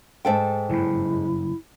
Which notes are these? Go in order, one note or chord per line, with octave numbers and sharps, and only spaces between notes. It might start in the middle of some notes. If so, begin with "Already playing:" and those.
G#2 A4 G5
F#1 G2 C#3 E4